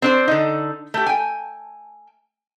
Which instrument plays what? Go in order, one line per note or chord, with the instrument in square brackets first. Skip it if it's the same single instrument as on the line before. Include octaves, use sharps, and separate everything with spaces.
[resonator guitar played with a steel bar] C4 D4 C5
D3 D#4
A3 G4
G5 G#5